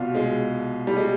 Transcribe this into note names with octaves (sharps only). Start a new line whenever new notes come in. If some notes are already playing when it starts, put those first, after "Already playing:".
Already playing: C2 B2 F4
G#3
G3
G#3